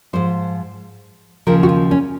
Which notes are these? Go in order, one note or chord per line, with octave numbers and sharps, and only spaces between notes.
G#2 F3 C5
D#2 C#3 F3 A#4
F#4
F4
C#4